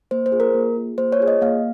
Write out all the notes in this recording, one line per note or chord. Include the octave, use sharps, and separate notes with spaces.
A#3 C5
C5
F4 G#4
A#4
A#3
F4 G#4
A#3 C5
C#5
F4 G#4
D#5
A#3 F5